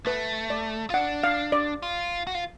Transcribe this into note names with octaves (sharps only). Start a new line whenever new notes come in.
A3 B4
D5
F4
D4 F#5
F5
D5
F4
F#4
F4